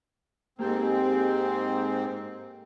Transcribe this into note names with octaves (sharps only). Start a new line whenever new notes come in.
G#2 A#3 C4 G4 A4